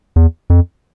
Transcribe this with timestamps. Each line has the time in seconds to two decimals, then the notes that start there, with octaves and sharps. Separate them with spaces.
0.16 E2
0.50 F2